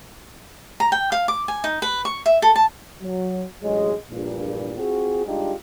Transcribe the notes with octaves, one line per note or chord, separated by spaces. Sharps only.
A#5
G5
F5
D6
G#5
D#4
B4
C#6
E5
A4
A5
F#3
A1 D2 F#3 G#3
A#1 E2 G2 A#2
C4 F4 F#4 G#4
G3 G#3 D4 D#4 F4 G4